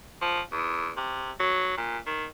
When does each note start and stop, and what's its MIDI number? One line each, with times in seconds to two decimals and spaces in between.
0.22 0.40 53
0.52 0.90 40
0.97 1.31 48
1.40 1.75 54
1.77 1.98 46
2.07 2.25 51